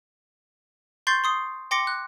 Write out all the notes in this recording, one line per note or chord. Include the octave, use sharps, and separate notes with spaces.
C6 C#6 G6 A6 C7
C6 D#6 C7
G5 C6 D6 A#6 C#7
F#6